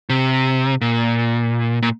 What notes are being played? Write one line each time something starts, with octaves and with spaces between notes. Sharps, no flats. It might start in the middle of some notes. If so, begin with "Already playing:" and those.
C3
A#2
A#2